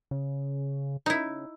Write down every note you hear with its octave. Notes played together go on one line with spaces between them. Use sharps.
C#3
C#3 D#4 E4